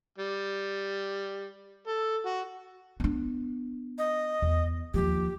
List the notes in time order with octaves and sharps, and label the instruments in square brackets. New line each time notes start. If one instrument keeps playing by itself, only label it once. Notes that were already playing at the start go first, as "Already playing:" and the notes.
[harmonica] G3
A4
F#4
[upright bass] B3 D4
[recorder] D#5
[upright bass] E2
[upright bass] D#2 F3 [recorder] G4